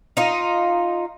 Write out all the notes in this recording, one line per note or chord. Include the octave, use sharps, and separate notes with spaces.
D#4 F4